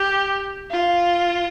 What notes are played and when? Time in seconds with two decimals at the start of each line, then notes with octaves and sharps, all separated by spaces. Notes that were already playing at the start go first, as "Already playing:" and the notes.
Already playing: G4
0.71 F4